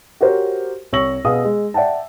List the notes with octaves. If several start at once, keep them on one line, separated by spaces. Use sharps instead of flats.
F#4 G4 A#4 C5 C#5
C2 C#5 C#6 E6 A#6 F#7
B2 B3 G#4 F5 D#6
G#3
D5 E5 F#5 G5 A5